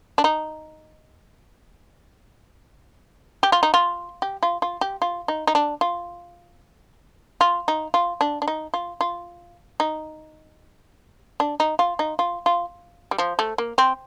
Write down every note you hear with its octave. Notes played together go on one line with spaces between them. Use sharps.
D4
D#4
G4
F4
D#4
F4
G4
F4
F4
G4
F4
D#4
D#4
D4
F4
F4
D#4
F4
D4
D4
D#4
F4
F4
D#4
D4
D#4
F4
D#4
F4
F4
G3
F3
A3
A#3
C4